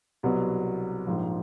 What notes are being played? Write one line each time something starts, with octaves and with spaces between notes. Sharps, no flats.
C2 B2 F#3 B3
A#1 G#2 F3